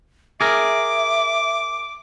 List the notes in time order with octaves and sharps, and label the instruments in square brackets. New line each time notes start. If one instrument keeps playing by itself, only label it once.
[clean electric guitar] G#4 A#4 [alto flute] E5 [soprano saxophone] D6